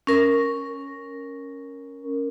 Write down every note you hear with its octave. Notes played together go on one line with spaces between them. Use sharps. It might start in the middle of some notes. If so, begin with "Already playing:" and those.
C#4 A#4